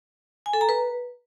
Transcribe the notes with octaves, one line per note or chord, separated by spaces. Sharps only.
G#5
A4
A#5
B4